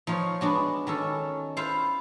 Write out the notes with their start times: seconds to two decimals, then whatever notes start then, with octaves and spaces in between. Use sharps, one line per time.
0.07 F3 D#4 F4 C#5
0.41 G#3 B3 D4 F#4
0.87 D#3 C#4 A4
1.57 E4 F4 C5 F5